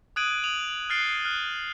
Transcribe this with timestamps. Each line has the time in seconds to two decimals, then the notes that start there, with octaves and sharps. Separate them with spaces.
0.16 D#6 F#6 G#6 D7 D#7 F#7
0.44 D#6 F7 F#7
0.68 F#7
0.90 F6 F#6 A6 C7 D7 G7
1.25 F6 F#6